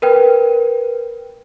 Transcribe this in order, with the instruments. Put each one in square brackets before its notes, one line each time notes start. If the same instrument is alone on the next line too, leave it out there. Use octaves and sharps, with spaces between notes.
[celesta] A#4 B4 G5